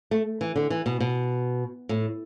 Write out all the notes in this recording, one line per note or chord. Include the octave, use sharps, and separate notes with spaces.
A3
E3
D3
E3
B2
B2
A2